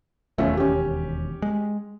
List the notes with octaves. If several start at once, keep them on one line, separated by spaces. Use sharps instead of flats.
E1 D#2 A3 C#4 F4
C#4 G4
G#3